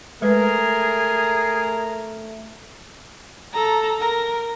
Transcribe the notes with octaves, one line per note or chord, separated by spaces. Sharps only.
G#3 A3 G#4 A#4 B4
A4 A#5
A#4 A#5